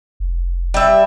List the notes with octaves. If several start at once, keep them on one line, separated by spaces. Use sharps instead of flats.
F1
G3 E5